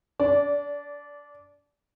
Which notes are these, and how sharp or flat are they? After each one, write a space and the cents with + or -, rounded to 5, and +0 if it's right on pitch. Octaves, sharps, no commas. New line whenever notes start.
D4 -30 D5 -15